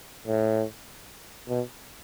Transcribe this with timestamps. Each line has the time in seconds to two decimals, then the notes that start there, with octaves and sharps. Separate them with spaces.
0.27 A2
1.49 B2